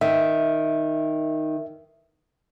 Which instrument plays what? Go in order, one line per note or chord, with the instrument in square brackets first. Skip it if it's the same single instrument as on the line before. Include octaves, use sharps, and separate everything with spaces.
[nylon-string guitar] D#3 [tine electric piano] E5